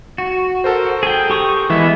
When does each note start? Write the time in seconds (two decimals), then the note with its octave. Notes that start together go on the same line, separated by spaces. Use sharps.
0.18 F#4
0.64 A4 A#4 C5
1.03 G#4 G5
1.30 G4 C#6 D#6
1.70 E3 G#3 B3 E5